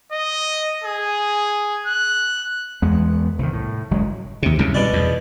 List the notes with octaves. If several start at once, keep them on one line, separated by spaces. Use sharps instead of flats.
D#5
G#4
F#6
E2 G#3 B3
C2 D#3
A2
F#1 F#3 G#3
D#2 C3
C2 F#2 C#3
B2 B3 D5
E2